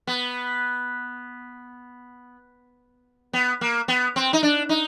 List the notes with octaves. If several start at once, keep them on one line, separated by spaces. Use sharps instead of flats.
B3
B3
A#3
B3
C4
D#4
D4
D#4